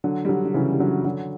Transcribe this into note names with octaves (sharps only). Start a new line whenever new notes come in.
D3 F#3
G3
D3 F#3
D3
C#3 E3
G3
D3 F#3
D3 F#3